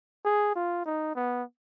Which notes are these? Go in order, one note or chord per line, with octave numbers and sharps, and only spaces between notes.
G#4
F4
D#4
B3